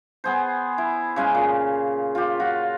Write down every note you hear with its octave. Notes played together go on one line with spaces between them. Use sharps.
B3 G#4 C5
E4
C#3 G#3 F5
A#2
F4 G4
F4 F#4